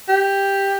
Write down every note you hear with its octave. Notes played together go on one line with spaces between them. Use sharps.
G4